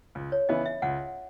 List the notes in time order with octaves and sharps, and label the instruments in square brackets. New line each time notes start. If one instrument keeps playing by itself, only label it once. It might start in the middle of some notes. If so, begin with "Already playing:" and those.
[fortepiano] C#2
[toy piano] C#5
[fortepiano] C#3 E3 B3 E4 [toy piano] D#5
[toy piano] E5
[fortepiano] C#2 [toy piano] F#5